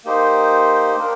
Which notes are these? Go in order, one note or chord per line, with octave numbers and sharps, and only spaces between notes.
A#3 D#4 G4 C5
A#3 D4 G4 A#4